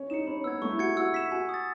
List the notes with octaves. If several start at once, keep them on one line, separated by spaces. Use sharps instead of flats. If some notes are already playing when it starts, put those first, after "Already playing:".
Already playing: C#4
D#4 C#7 E7
C#4 B5
B3 E6 G#6
A3 C#6
E4
F#4 G#6 C#7
E4
F#4 E6
B6 E7
F#4 G#5
D#6 A6